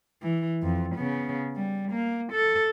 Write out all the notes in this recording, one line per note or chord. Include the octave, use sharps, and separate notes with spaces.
E3
F2
C#3 B3
G3
A#3
A4